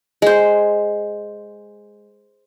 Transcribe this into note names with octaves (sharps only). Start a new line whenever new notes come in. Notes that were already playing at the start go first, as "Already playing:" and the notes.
G#3 C5